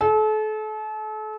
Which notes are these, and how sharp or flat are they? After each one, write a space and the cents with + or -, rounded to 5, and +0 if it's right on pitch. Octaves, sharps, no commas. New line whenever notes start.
A4 -35